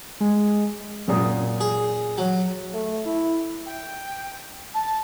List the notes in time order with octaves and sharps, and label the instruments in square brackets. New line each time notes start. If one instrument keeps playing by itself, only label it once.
[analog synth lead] G#3
[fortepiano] F#2 A#2 D#6
[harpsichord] G#4
F#3
[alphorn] A3
E4
[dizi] G5
A5